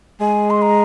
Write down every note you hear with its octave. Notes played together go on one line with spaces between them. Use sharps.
G#3 G#5
C6
A#5